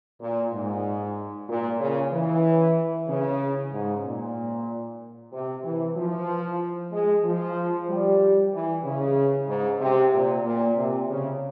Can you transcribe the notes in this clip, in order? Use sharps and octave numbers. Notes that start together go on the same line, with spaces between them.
A#2
G#2
A#2
C#3
E3
C#3
G#2
A#2
C3
E3
F3
G#3
F3
G3
E3
C#3
G#2
C3
A#2
A#2
C3
C#3